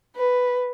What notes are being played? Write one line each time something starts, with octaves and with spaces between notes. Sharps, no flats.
B4